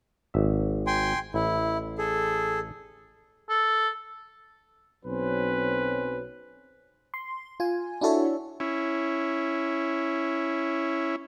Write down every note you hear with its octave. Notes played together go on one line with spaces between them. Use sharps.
G#1 E5
G5 G#5 C6
A1 E4
G#4 A4
A4
B1 F#3 C4 C#4 B4 C5
C6
F4 G#5
D4 E4 F#4 A4 C#5 E5
C#4 E4